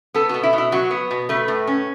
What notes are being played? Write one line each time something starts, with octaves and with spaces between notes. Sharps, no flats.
B3 A4
B2 F#4
E4
B2
E4
F#3 F#4
B3
B2
A3 B4
A2
C#4